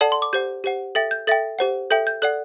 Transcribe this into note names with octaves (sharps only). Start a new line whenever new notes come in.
A4 D5 F#5 A5
C6
D6
G4 C5 F#5 G6
G4 C5 F#5
A4 E5 G5 A6
G6
A4 E5 G5 A6
G4 C5 F#5
A4 E5 G5 G6
G6
A4 D5 F#5 F#6